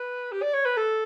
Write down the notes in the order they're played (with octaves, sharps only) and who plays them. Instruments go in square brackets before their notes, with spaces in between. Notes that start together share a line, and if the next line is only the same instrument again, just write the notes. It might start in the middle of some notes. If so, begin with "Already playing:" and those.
Already playing: [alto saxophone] B4
G4
D5
C#5
B4
A4